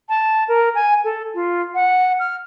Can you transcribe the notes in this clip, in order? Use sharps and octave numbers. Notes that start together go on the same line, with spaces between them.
A5
A#4
G#5
A4
F4
F#5
F6